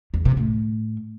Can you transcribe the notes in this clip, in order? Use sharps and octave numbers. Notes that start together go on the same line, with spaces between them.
E2
C3
A2